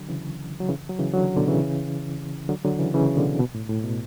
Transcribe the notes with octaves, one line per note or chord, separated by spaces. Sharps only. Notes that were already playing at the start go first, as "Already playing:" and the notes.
Already playing: D3 F#3
C#3 E3
F#3
C#3 E3
F#3
C#3 E3
D3 F#3
B2 D3
C#3 E3
D3 F#3
D3 F#3
C#3 E3
C#3 E3
B2 D3
B2
A2
A2
B2